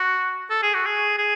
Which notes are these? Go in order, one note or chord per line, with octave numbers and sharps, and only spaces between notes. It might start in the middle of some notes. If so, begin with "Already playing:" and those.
Already playing: F#4
A4
G#4
F#4
G#4
G#4